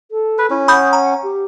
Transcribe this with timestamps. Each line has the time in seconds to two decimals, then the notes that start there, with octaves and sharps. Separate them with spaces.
0.11 A4
0.38 B4
0.50 C#4 E4
0.68 F#5 B5 D#6 G6
0.93 A#5
1.23 G4